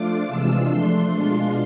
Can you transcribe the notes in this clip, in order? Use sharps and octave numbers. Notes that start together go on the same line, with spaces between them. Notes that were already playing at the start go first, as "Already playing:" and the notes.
Already playing: F3 A3 D4 F4 D6
C3 E3 G#3 D4 F4 E6
F3 A3 D4 C6
B2 G#3 D4 F4